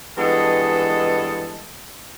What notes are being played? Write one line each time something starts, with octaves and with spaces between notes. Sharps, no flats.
G2 E3 G#3 B3 A4 D#5